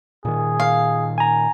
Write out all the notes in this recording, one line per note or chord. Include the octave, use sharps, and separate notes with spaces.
A#2 D#3 G#4
F5
G#5 A#5